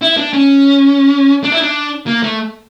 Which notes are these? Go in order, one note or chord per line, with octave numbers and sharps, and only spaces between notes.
E4
D4
C#4
D4
E4
D4
A#3
A3